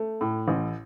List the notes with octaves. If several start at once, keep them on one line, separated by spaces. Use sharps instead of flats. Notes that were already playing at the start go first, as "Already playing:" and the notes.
Already playing: A3
A2
A1